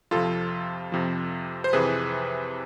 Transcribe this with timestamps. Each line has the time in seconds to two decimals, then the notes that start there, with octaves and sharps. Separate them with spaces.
0.11 F2 C3 F3 F4 A4
0.92 F2 C3 F3
1.64 C5
1.73 F2 C3 E3 G#4 B4